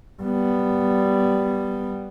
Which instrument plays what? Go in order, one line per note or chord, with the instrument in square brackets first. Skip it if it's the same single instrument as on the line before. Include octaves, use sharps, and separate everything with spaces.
[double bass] G3 B3